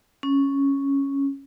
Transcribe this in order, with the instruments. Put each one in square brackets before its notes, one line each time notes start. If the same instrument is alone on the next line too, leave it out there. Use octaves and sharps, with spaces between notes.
[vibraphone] C#4